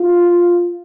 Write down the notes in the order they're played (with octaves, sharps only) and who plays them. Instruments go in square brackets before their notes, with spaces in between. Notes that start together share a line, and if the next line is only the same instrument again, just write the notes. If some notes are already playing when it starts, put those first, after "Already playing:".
Already playing: [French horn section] F4